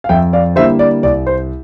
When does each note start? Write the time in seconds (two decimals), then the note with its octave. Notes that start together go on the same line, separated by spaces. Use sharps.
0.04 F5
0.09 F2 E5 G5
0.33 D5 F5
0.56 D3 G3 A#3 E4 C5 E5
0.79 D5
1.03 C2 D5
1.27 C5